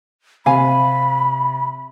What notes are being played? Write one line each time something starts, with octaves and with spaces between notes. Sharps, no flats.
C3 F5 G#5 B5